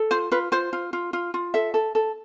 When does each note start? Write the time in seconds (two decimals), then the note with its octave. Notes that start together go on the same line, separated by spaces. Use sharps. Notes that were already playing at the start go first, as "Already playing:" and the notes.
Already playing: A4
0.11 F4 C5
0.31 F4 B4
0.52 F4 C5
0.73 F4
0.93 F4
1.13 F4
1.34 F4
1.54 A4 E5
1.74 A4
1.95 A4